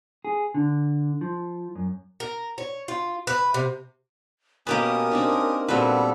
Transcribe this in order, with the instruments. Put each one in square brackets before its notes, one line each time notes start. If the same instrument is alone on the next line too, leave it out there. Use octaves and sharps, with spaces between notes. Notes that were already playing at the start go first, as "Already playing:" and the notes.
[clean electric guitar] G#4
D3
F3
F#2
[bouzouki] A#4
C#5
F4
B4
C3
[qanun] B2 A5 [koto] A#3 G4 B4 [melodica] C#4 D#6 [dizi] A#4
[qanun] C4 D4 D#4
[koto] A#2 B4 [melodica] G3 B3 A4 [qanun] C4 F#4